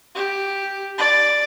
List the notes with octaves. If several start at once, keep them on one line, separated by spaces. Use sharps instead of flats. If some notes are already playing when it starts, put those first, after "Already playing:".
G4
D5